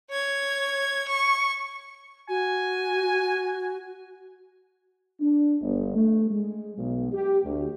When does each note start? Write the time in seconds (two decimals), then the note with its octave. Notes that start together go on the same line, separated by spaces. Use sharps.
0.10 C#5 G#6
1.08 C#6
2.29 F#4 G#5
5.21 D4
5.61 G1
5.96 A3
6.31 G#3
6.78 B1
7.12 G4
7.45 D2